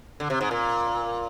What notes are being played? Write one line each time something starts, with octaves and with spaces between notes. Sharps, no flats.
D3
C3
G#2
A#2